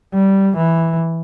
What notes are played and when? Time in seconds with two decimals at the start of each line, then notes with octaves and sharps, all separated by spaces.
0.14 G3
0.57 E3